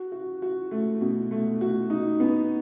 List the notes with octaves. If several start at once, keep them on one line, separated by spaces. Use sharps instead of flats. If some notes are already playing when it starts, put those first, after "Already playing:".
Already playing: F#4
F#4
F#4
A3
B2
A3
F#4
D#4
B3